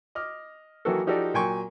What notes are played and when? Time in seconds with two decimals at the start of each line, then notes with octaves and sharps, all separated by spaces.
0.15 D#5 D6 F6
0.85 D#3 E3 F#3 A#3 F#4 A4
1.07 F3 D#4 F#4 G4 A4 D5
1.34 A#2 F#3 G5 G#5 C6 C#6